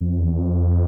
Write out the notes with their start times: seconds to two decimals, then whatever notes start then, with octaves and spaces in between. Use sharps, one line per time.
0.01 F2
0.20 E2
0.39 F2